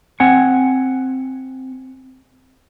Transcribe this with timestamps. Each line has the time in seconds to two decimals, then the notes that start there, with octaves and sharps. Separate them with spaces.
0.20 C4 F#5 G#5